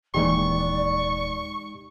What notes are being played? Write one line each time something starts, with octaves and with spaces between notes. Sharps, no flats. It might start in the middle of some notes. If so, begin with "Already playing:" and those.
D#1 E3 G#3 A#3 D#4 G4 D5 C#6